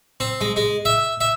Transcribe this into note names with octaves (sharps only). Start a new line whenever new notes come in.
C4
G#3
G#3
E5
E5